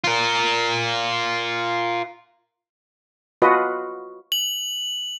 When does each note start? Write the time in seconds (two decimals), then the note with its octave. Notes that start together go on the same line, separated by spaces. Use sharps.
0.04 F4 A#4
3.42 F4 F#4 B4 D#5
4.32 F#7